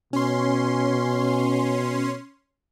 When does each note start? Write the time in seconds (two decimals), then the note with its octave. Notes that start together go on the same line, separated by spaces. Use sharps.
0.13 B2 C#4 C6